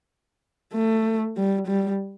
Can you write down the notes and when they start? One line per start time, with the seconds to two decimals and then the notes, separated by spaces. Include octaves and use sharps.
0.74 A3
1.37 G3
1.67 G3